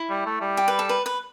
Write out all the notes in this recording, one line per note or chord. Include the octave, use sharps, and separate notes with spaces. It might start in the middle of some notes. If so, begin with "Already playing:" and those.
Already playing: E4
G3
A3
G3
G4
B4
A4
B4
B4